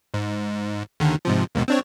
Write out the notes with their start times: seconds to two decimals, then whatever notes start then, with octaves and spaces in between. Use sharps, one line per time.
0.14 G#2
1.00 D#2 D3 D#3
1.25 G#2 C3 F3
1.55 D#2 G#2 B2
1.68 C4 D4 C#5